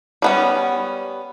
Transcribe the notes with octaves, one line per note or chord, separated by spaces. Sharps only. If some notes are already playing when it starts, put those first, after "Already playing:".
G3 B3 C#4